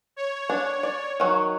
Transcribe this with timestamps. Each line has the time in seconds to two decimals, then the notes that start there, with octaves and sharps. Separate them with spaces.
0.16 C#5
0.50 D4
0.83 D5
1.20 D#3 F#3